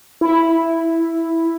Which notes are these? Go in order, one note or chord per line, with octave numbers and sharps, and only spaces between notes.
E4